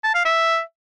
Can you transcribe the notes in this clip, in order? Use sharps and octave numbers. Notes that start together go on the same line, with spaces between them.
A5
F5
E5